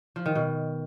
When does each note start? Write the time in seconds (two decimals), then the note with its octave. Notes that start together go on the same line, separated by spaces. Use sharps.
0.16 F3
0.26 D#3
0.35 B2